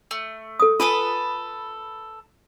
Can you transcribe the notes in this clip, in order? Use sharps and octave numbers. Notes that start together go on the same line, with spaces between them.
A3
A4 D#6
F4 A4 B4 G#5 D#6